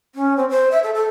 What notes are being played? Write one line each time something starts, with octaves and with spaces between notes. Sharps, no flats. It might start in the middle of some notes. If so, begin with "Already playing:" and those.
C#4
C4
C5
E5
A4
A4